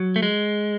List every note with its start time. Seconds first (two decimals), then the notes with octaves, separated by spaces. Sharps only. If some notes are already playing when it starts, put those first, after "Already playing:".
Already playing: F#3
0.16 A3
0.23 G#3